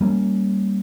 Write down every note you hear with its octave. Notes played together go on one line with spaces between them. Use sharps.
G3 A#3 C4 C#4